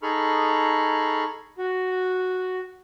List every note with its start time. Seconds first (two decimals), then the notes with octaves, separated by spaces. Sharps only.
0.03 D#4 G#4 A4 B5 C#6 F6
1.58 F#4